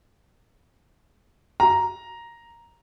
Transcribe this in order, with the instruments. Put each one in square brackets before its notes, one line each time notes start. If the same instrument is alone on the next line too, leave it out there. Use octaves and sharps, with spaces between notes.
[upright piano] A#5